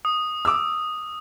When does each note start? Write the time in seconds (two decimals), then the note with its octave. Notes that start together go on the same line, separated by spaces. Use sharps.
0.05 D#6
0.45 D6 E6